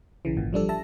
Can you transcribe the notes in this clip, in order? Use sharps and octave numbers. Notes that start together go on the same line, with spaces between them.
B1 C#3 E3
G#1 A#2
F3 G3 D4 A4
E5 A5 A#6